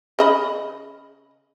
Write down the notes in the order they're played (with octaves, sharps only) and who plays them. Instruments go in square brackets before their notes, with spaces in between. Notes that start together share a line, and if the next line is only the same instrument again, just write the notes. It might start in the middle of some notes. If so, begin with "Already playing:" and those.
[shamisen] C#3 D#5 B5